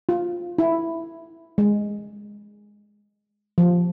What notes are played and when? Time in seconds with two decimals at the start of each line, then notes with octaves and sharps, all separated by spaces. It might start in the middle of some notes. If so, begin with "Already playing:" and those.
0.09 F4
0.59 E4
1.58 G#3
3.58 F3